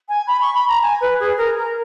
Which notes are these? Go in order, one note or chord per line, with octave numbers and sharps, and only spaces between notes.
G#5
B5
C#6
B5
A#5
G#5
B4
G#4
A#4
A#4